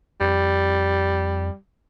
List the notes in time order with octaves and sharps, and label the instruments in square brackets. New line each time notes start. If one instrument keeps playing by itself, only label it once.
[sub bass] F2 [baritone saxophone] G3